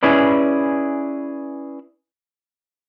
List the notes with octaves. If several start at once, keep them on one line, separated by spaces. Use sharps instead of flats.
C#4 E4 G#4 B4 D5